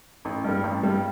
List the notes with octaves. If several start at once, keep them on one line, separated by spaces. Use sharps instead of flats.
A1
G2 G3
A1
G2 G3